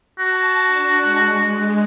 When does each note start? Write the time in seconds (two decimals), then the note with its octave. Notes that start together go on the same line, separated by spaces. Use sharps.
0.19 F#4 A5
0.66 D4
1.02 G#3
1.34 G#3